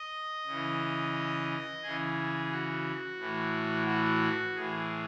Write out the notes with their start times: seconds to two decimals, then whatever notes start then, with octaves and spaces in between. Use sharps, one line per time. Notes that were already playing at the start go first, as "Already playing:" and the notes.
Already playing: D#5
0.47 C#3
0.52 E3
1.83 C#3 E3 G#4
2.51 F#4
3.20 A2 E3
3.87 F#4
4.55 A2 E3 G#4